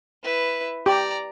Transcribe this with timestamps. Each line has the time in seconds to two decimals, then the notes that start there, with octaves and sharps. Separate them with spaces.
0.23 E4 B4
0.86 G4 D5 A#5